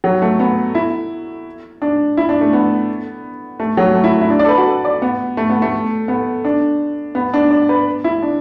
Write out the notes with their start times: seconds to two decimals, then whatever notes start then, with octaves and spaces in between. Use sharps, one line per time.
0.04 F#3
0.22 A3
0.39 B3
0.75 E4
1.82 D4
2.17 E4
2.29 D4
2.41 A3
2.53 B3
3.60 A3
3.77 F#3
3.95 A3
4.04 E4
4.21 E4
4.30 D4
4.39 D5
4.45 A4
4.49 B4
4.57 F#4
4.66 A4
4.85 D5
5.02 B3
5.37 A3
5.50 B3
5.62 A3
6.08 B3
6.45 D4
7.15 B3
7.34 D4
7.51 D5
7.69 B4
8.04 E4
8.22 D4